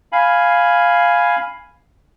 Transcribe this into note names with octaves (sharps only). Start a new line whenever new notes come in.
F5 G#5 B5